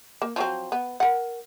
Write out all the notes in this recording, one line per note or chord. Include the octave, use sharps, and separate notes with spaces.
A#3
F3 F#3 C4
B3
A#4 F#5